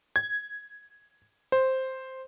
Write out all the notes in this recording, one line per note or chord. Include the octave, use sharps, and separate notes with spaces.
G#6
C5